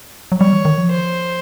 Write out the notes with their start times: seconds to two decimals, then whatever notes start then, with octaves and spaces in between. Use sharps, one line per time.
0.32 F#3
0.40 G3 C#5
0.53 E3
0.65 D#3
0.78 F3
0.91 C5